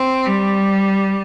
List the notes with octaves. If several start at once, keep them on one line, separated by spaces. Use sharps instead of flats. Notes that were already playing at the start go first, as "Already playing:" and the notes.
Already playing: C4
G3